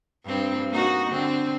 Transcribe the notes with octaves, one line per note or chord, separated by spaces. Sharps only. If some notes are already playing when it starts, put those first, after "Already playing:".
G2 C4
A#3 D#4 F#4
D3 C4